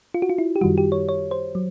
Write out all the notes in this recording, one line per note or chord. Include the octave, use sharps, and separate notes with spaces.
F4
F#4
F4
E4
G4
F#2 D#3 G3 F#4
G4
C#5
C#5
C5
F#3